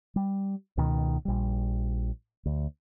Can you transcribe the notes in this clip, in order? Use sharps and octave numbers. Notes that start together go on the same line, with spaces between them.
G3
C#2 B2 D#3
A#1 G3
D2